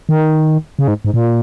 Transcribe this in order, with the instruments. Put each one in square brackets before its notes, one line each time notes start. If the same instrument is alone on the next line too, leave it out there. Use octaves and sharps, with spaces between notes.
[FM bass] D#3
C#3
G#2
G#2
A#2